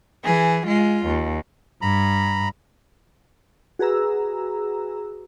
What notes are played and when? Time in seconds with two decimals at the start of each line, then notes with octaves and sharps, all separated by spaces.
0.24 E3 G#4
0.67 G#3 F4
1.07 D#2
1.82 G2 A#5 B5
3.79 F#4 G#4 B4 A#5 E6